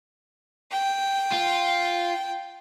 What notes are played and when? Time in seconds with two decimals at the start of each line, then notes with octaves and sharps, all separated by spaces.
0.71 G5
1.32 F4